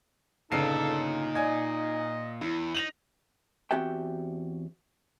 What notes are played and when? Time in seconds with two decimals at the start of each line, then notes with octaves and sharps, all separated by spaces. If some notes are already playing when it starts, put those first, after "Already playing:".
0.52 G1 A#2 C#3 D#4 A4 C7
1.35 D5 D#5 G#5 G#6
2.41 E2 E4
2.75 D#4 A#6 F7 F#7
3.71 E2 C4 F#4 G4 E5 G5